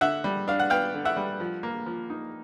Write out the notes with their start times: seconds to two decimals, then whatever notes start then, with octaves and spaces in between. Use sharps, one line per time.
0.01 D3 E5 F#5
0.24 G3
0.48 D4 F5
0.60 F#5
0.70 B3 F5 G5
0.94 D3
1.05 E5 F#5
1.17 G3
1.40 F3
1.63 A#3
1.86 F3
2.10 D#4